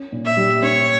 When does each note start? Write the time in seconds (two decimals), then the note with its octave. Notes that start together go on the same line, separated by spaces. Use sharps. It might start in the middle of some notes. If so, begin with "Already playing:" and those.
Already playing: C#4
0.12 A#2
0.25 E5
0.37 G3
0.62 C#4 C#5